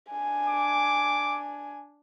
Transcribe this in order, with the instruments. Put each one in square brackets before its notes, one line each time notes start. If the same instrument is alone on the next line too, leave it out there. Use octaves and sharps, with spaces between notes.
[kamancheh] D4 G#5
[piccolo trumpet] D6